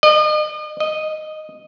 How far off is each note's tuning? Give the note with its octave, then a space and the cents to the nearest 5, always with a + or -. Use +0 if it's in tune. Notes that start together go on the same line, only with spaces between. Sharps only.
D#5 -40
D#5 -5